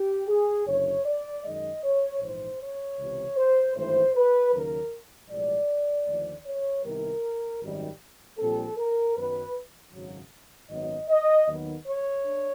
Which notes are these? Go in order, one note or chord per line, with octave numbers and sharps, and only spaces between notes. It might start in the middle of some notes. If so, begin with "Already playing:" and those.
Already playing: G4
G#4
F#1 F#2 D3 C#5
D5
F#2 D#3 G#3 D#5
C#5
A#1 G#2 E3 C5
C#5
C#2 C3 E3
C5
G#1 G2 E3 A3 C5
B4
D#2 C#3 F#3 A#4
B1 A2 F3 G#3 D5
D#2 D3 F3 A3
C#5
C2 C3 D#3 G3 B3 A#4
G#1 F#2 D#3 G3
A#1 A#2 G3 C4 A4
A#4
F#2 D#3 F#3 B3 B4
G#1 F#2 C#3 F#3
G#1 F#2 D#3 F#3 B3 D#5
D#5
D#2 D#3 F#3 B3
C#5
D4